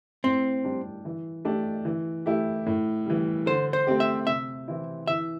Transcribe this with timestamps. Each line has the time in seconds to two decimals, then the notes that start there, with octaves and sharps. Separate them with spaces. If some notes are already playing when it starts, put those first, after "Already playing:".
0.24 A2 C4
0.64 G3 D4 G4
1.05 E3
1.45 A3 D4 G4
1.85 E3
2.26 A3 E4 G4
2.66 A2
3.06 E3 G3
3.46 D3 C5
3.73 C5
3.87 A3 C4 G4
4.00 E5
4.27 C3 E5
4.68 E3 C4 E4
5.08 E3 E5